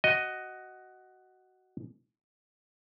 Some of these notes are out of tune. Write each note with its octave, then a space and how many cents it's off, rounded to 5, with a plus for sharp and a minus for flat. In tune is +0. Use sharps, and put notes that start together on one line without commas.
F#4 +10 D#5 +0